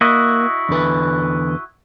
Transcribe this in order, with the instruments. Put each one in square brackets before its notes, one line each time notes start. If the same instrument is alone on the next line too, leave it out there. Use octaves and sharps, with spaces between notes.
[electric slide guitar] A#3 [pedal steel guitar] E4 F#4 D#5
[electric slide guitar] E2 D3 B4